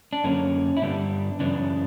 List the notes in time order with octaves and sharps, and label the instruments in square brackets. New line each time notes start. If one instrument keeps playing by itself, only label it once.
[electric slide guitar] D4
F#2 D3 A#3 C#4
E4
G2 D3 G3 B3 D4
F#2 C#3 E3 B3 D4